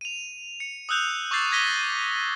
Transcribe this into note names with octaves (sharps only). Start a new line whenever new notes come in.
D#7 F7
C#7
D#6 E6 F#6 G6 F7
C#6 D6 E6 G6 A6 C7
D6 G#6 A#6 B6 D#7 G7